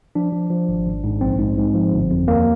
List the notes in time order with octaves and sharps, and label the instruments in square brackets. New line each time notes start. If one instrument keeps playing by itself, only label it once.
[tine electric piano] F3 D4
F3
F3
G#1
G#1
G#2
A#1 C4
G#2
G#2
F3
G1
F2
D#2 A#3